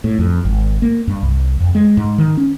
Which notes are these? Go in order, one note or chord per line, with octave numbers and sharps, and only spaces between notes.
A2
F2
G#1
A#3
G2
C2
F2
G#3
G#2
D#3
C#4